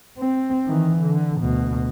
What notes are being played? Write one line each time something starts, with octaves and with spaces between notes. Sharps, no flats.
C4
D#3 E3
D3
D2 B2